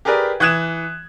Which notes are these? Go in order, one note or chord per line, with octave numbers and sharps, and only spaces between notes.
G4 G#4 A#4 B4 D5
E3 D#6 F#6 G#6 E7